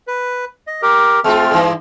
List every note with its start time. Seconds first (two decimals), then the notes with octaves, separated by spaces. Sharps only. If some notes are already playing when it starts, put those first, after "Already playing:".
0.07 B4
0.67 D#5
0.82 G4 A#4
1.24 G#3 A3 C4 F4 F6
1.51 G2 E3